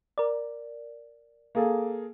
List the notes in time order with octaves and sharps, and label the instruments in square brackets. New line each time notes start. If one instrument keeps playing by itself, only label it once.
[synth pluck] A#4 D5
[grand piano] A#3 G#4 A4